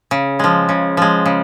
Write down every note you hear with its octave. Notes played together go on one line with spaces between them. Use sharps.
C#3
F3 G#3
C#3
F3 G#3
C#3